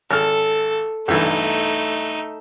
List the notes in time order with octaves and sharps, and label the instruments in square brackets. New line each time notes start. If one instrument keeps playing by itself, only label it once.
[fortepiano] G#1 F6 [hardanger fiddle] A4
[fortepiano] B1 G2 E3 [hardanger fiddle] A3 D#4